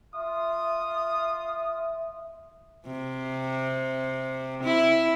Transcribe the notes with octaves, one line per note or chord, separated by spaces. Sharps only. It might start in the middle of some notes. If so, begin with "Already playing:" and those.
F4 E5 F5 D#6
C3
E4